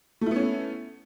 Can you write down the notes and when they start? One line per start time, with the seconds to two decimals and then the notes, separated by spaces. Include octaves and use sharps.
0.21 A3
0.26 E4
0.31 B3
0.36 C#4